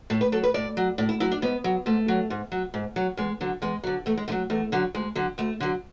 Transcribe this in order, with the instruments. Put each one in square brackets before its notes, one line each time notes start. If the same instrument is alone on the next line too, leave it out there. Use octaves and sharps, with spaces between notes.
[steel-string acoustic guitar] A2 A4
B4
F#3 A4
B4
A2 D5
F#3
A2 D5
E4
F#3 E4
D4
G#2 B3
F#3
G#2 A3
F#3
G#2
F#3
G#2
F#3
E2 G#3
D3 F#3
E2 G#3
D3 F#3
E2 A3
G#3
D3 A3
F#3
E2 A3
D3 F#3
D2 G#3
D3 F#3
D2 A3
D3 F#3